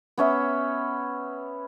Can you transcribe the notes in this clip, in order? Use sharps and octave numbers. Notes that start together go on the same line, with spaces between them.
B3 C#4 E5